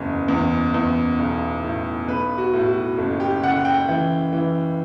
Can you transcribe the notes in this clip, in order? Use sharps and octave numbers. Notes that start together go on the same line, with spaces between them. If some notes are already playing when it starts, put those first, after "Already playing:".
Already playing: F#1 E2
E2
E2
B1
A2
B1 B4
F#4
A2
F#4
F#1
G4
C#3 F#5
G5
E3
E3